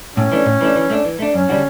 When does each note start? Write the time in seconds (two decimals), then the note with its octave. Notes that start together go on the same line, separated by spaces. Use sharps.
0.17 A2 C#4
0.31 E3 A3 D4
0.46 A2
0.61 E3 A3 D4
0.75 E3
0.90 A3 D4
1.05 E3
1.19 A3 D4
1.34 F#2 C#4
1.49 D3 G3 D4 F#4